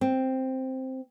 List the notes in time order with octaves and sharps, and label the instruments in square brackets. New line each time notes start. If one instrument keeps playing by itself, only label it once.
[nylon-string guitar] C4